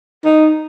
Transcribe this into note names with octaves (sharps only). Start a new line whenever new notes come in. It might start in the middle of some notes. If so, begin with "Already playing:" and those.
D#4